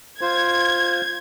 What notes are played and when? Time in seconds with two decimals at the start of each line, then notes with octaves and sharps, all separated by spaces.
0.21 F4 C5 G#6